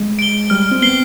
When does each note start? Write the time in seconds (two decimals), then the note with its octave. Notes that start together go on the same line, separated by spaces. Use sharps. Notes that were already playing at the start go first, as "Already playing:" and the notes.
Already playing: G#3
0.19 D7 G7
0.50 G3 F6
0.71 C4
0.82 B3 C7 G7